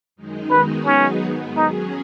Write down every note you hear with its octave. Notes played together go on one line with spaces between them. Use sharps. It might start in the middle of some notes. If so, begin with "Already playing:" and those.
F#2 D#3 G#3 D#4
D#3 G#3 B3 D#4 F#4 B4
F#3 B3 C#4 D#4 G#4
G#2 D#3 B3
F#3 C#4 D#4 G#4